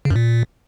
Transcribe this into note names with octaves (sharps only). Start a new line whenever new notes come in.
C#3
F#2
A#2